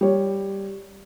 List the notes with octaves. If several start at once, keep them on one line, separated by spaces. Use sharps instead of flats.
G3 C#5